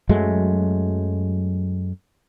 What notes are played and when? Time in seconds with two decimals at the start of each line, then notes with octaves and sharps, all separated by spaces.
0.09 F#2 F#3 G#3 A3